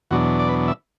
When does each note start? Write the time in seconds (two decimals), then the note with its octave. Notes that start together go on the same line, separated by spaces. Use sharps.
0.11 E2 B2 F#3 D4 F#4
0.39 D5
0.49 B4
0.68 E5